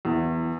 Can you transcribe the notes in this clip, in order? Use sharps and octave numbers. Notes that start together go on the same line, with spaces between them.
E2